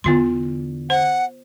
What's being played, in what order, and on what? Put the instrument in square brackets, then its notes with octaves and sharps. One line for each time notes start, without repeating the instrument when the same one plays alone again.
[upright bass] E2 D3 [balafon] B3 F4 C6
[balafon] C5 [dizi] F#5